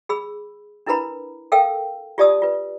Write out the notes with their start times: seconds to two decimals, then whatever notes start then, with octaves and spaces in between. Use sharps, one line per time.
0.09 G#4 B5 E6
0.87 D4 E4 A#4 B4 A#5 B5
1.52 A4 A#4 F5 G5 E6
2.18 F4 G4 D5 A5 D#6 E6
2.42 F4 B4